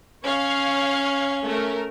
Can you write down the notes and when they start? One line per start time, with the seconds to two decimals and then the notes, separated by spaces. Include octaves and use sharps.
0.24 C#4 C#5 F5
1.44 A3 A#4